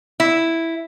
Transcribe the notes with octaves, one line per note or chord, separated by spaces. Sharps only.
E4